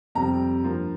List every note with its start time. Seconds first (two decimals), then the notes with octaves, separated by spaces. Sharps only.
0.15 F2 C3 G3 C4 A#5
0.63 G2 F3 A#3